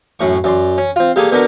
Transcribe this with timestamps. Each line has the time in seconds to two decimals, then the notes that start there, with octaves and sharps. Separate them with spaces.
0.19 F#2 A2 C#6
0.44 F#2 D5 C6
0.78 C#4
0.96 C4 F4
1.16 G3 A#3 G#4 A4
1.32 B2 D3 D4 A#4